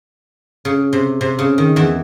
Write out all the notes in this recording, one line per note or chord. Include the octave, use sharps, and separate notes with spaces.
C#3
C3
C3
C#3
D#3
E2 E3